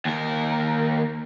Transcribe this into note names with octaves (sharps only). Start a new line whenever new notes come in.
D#2 A#4